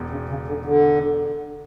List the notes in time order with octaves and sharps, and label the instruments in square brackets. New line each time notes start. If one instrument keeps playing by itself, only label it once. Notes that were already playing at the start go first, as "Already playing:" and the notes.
Already playing: [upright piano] E1 E2
[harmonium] C#3
C#3
D3
D3